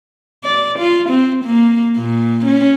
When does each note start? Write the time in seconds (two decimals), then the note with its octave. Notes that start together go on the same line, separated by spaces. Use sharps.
0.44 D5
0.79 F4
1.09 C4
1.44 A#3
1.97 A#2
2.45 C#4